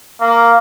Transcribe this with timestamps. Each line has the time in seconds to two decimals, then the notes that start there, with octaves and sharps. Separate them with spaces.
0.21 A#3